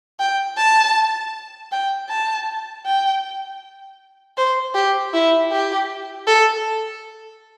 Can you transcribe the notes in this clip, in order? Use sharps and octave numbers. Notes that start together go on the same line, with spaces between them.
G5
A5
G5
A5
G5
C5
G4
E4
G4
A4